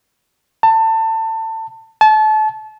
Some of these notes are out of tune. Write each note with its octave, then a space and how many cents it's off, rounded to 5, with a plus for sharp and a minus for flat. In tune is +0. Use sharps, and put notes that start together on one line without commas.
A5 +25
A5 -30